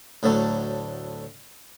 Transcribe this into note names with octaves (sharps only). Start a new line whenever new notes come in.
D2 A2 F#3 A3